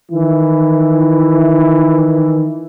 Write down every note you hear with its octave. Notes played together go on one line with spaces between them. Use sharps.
D#3 E3 E4